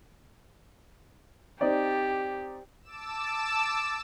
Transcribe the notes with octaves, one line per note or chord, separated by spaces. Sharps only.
C4 D#4 G4 D5
A5 D6 E6 E7